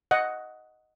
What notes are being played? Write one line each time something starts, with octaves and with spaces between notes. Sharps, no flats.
D#5 F#5